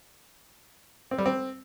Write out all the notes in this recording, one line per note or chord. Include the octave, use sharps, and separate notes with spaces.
C4
G3
C4